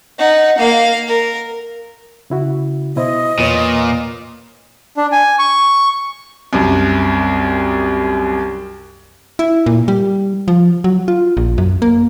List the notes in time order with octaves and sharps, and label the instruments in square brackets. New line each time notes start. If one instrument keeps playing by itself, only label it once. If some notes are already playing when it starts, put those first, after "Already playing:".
[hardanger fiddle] D#4 F#5
A#3 F5
A#4
[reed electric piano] C#3 E4 F#4
[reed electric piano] B2 E4 C5 [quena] D#5
[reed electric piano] E2 B4 C#5 [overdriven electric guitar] A#2
[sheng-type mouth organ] D4
G#5
C#6
[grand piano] C2 F#2
[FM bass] E4
A#2
G3
F3
F#3
F4
A#1
F#2
A#3